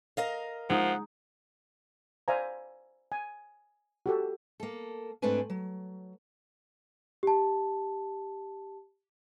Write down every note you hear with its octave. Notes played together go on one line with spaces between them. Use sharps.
A#4 D#5 F5
F3 G#3 D#4 F#5
C5 D5 E5 F5 G#5 A#5
G#5
F#4 G4 A4
A#3 A4
G#2 A3 C4 D4 B4 G#5
F#3
G4 A5